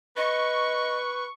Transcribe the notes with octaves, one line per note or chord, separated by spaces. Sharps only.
B4 D#5 C#6